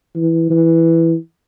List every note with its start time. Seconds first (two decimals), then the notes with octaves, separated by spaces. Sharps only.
0.16 E3
0.50 E3